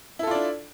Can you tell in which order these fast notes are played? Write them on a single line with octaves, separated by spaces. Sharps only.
E4 A4 F4 D5 D4